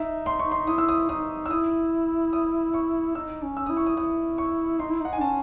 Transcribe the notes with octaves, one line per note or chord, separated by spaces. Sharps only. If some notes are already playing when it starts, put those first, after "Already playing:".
Already playing: D#4 E5
C6
C#6
C6
E4 D#6
E6
D#6
D#4 D#6
E6
E4 D#6
D#6
C#6
D#4 E6
C#4
E6
E4 D#6
C#6
D#6
E4 D#6
C#6
D#4 C6
E4
D#4 F#5
G#5
C#4 A5